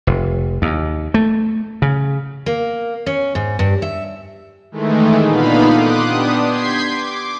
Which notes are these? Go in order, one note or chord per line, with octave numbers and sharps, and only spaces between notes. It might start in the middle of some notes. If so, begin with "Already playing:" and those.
F1
D#2
A3
C#3
A#3
C#4
G#2
G2
E5
D#3 E3 G#3 A3
A#2 D3 B3 D#4 F5 B5
C6 D6 D#6 F#6
B3 D4 G4 D#6
C6 G6 G#6 B6 C7
D6